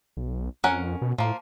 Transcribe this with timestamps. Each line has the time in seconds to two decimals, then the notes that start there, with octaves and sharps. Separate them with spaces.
0.17 B1
0.64 F2 C#4 A#4 F#5
1.02 B2
1.18 A2 F3 A#3